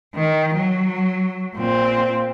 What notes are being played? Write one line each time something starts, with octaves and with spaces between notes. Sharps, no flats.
D#3
F#3
A#2 C4